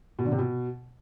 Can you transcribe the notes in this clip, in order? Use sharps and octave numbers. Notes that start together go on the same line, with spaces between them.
B2
D3
C3
B2